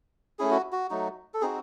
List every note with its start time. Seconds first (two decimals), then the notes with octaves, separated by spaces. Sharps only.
0.39 A3 C#4 E4 G#4
0.51 F#4
0.72 F#4
0.90 F#3 A3 D#4 F#4
1.34 A4
1.41 C4 D#4 F#4 G#4